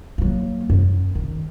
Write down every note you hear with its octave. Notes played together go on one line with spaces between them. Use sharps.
F#3 A#3
F#2
D#3